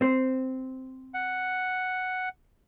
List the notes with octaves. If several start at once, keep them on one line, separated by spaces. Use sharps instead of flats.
C4 C5
F#5